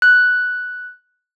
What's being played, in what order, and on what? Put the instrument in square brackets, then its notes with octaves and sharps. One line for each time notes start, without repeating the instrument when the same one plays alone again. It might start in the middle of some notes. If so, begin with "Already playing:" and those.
[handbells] F#6